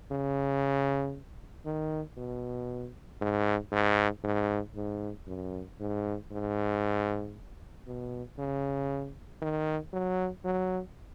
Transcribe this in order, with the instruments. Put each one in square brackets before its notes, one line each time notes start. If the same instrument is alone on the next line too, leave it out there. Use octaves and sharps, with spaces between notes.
[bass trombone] C#3
D#3
B2
G#2
G#2
G#2
G#2
F#2
G#2
G#2
B2
C#3
D#3
F#3
F#3